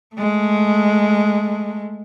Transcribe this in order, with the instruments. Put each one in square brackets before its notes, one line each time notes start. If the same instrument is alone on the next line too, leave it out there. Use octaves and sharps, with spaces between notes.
[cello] G#3 A3